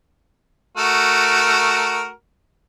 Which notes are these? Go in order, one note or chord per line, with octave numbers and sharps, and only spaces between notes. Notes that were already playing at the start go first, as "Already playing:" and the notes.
A3 F#4 A#4